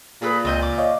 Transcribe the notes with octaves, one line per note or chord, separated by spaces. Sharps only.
A#2 G#4 A4 B4
C#2 C4 D#5 G6
D6
C#5 D#5 F5